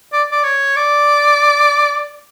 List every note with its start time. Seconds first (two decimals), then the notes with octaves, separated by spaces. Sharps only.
0.12 D5
0.32 D5
0.43 C#5
0.76 D5